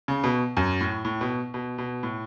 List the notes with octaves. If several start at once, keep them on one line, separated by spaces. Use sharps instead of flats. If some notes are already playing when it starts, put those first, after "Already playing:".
C#3
B2
F#2
A2
A2
B2
B2
B2
A2